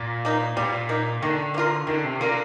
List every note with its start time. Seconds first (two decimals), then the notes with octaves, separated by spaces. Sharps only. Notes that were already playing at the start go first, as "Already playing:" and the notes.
Already playing: A#2
0.25 A#3 D#4
0.57 A#2 G3
0.89 A#3 D#4
1.22 D3 D#3
1.54 A#3
1.58 F4 A#4
1.87 D3 D#3
2.04 C3
2.20 D3 A#3 F4 A#4